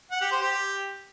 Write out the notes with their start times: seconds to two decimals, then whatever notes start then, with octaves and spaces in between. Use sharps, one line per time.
0.11 F#5
0.21 G4
0.32 C5
0.42 G4